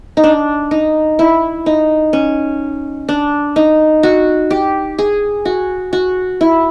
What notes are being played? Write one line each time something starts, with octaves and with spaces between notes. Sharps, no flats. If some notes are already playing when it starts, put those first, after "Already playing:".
D#4
D4
D#4
E4
D#4
C#4
D4
D#4
F#4
G4
G#4
F#4
F#4
E4